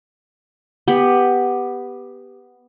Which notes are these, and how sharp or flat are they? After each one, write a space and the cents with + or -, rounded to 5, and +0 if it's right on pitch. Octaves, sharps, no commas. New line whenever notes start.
B3 +0 G4 +10